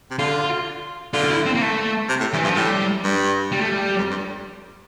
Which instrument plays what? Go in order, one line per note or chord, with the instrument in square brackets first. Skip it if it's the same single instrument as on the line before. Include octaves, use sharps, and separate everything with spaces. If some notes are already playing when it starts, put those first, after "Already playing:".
[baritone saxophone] C3
[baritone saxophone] D3 [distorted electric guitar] F4
[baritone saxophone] D3 [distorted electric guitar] F4
[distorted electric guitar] F4
E4
C4
A#3
A3
[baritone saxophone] C3
A2
[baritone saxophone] G2 [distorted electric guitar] E3
[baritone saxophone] G2 [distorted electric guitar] F3
[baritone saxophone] A2 [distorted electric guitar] G3
[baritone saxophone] G2
[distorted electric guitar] G3
A3
G3
[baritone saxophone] F2
G2